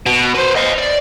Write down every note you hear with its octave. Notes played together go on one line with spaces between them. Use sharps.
B2
B4 C5
D#5 F5
D5